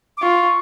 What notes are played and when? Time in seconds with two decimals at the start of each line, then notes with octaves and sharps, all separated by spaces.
0.17 D6
0.22 F4 C#6